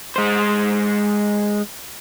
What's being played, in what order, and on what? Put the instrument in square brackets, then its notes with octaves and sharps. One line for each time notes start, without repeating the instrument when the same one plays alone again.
[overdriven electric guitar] G#3 C5